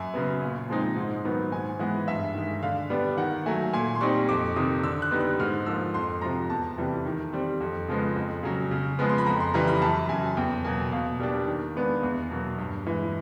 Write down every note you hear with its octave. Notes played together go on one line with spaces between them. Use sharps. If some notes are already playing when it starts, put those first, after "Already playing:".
Already playing: F#2 G#5
C#3 F#3 B3
A#2
F3 G#3 C4 D#4
G#2
D#3 F#3 B3
G#2 G#5
E3 G#3 B3 F#5
G2 E5
D#3 G#3
D3 F5
G3 B3 D4
D#3 F#5
F#3 A3 G#5
A#2 G#5
C6
G3 C4 D#4 C#6
F2 D6
C3 D#3 D#6
D3 E6
F#6
G3 B3 D#4
F#6
G#2 F6
F3 A#3 E6
F2 C6
C3 F3 A#5
E2 A5
C3 E3 G3
D#3
G3 C4
F2
C#3 F3 G#3 B3
F2
C#3 F#3
C#3
F3 G#3 B3
C6
B5
F2 A#5
C6
C#3 E3 G3 A#5
B5
F#2 A5
C#3 F#3 G#5
E2 G5
B2 F#3 A#3 G#5
B2 F5
G3 A#3 D4
D#3
G#3 B3 D4
E2
B2 F#3 A#3
G2
E3 G#3